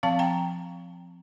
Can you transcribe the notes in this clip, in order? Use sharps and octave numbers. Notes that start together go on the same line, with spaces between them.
F3 C4 F5 A5
G5 A#5